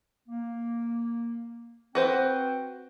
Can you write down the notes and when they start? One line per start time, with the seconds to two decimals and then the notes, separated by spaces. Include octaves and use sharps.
0.29 A#3
1.95 C4 F#4 B4 C5 G5